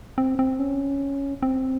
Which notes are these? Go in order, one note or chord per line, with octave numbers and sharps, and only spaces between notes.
C4
C4
C#4
C4